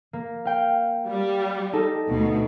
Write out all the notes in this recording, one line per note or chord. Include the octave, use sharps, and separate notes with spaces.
A#3
F5 G5
G3
D#4 A4 A5
D2 B2